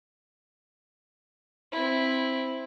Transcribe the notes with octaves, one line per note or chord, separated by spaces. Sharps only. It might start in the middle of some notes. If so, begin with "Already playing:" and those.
C4 E4